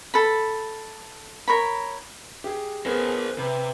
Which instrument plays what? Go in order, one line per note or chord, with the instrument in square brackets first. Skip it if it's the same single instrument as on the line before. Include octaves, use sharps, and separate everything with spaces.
[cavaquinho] A4 B5
A#4 C#5 B5
[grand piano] G4 G#4
[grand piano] B3 G#4 [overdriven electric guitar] A#4 C5
[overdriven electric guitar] C3 [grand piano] B4